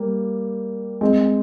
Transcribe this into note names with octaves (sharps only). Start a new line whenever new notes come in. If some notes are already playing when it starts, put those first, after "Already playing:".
Already playing: G3 A#3
G#3 C4